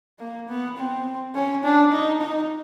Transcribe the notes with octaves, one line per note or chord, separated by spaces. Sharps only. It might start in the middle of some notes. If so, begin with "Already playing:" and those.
A#3
B3
C4
C#4
D4
D#4
D#4